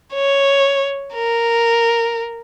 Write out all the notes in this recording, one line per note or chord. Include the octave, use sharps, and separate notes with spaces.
C#5
A#4